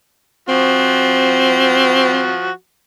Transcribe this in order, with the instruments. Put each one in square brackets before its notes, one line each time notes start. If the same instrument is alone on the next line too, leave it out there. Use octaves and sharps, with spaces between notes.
[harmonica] F3 F#4 [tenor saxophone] C4